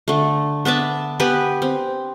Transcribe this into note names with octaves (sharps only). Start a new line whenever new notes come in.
D3 A3
B3 D4 E5 A5
B3 G4 B4 G#5
C4